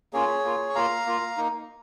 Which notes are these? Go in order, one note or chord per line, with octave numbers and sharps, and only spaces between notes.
A#3 C#4 F4 G#4 C#5
A#3 F4
C#6
A#3 F4 F5 A#5
A#3 F4
A#3 D#4